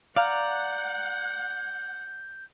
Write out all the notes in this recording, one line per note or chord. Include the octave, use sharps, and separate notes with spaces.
D5 F5 F#5 A#5 G6